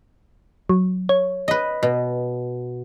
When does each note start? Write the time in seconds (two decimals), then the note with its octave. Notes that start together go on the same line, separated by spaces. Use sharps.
0.69 F#3
1.09 C#5
1.48 B4 D#5
1.83 B2